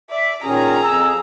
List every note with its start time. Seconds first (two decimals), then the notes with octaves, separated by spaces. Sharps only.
0.10 D5 E5
0.44 A#2 D#3 C#4 G#4 A#5
0.84 F2 E6